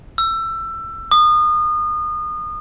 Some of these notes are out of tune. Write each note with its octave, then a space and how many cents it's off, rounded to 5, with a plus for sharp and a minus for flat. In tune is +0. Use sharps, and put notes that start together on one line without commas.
E6 +20
D#6 -30